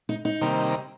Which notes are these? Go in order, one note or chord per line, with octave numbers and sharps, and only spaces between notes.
D#4
D#4
C3 D#3 G3 A#3